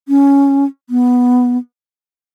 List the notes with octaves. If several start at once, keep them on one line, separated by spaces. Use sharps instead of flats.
C#4
B3